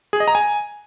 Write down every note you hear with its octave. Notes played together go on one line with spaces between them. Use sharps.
G#4
D#5
A#5
G#5